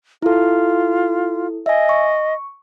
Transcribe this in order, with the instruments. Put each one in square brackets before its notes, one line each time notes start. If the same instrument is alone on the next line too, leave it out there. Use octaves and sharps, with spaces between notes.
[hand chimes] E4 A4 [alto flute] F4
[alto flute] D#5 [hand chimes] E5 G#5
[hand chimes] C#6